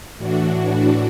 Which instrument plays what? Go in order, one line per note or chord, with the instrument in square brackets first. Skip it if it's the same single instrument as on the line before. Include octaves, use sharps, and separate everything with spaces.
[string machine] A2 E3 D4 F#4